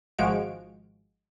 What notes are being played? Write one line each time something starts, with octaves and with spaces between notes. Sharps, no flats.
G#1 F3 G#3 F#4 F5 D7